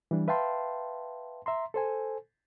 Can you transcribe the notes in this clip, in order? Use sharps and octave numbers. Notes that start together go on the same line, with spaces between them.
E3 G3 D4
B4 E5 F5 G5 A5 C6
E5 A#5 C6
A4 C5 G#5